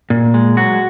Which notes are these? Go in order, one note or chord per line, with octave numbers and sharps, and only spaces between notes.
A#2
G#3
F#3 F#4